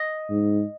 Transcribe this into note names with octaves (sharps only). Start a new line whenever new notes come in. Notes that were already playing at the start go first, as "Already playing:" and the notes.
Already playing: D#5
G#2